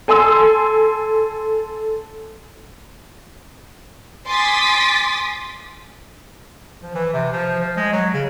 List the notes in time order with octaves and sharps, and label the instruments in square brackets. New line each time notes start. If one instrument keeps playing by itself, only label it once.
[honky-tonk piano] A4 G#5 C6 E6
[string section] G#5 C6 D6 D#6 A6 B6
[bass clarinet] F3
E3
C3
F3
F3
G#3
F#3
C#3